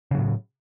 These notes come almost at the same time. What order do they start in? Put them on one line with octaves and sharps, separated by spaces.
C#3 F#3 A2